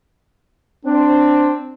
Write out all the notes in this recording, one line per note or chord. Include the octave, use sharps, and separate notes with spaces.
C4 D4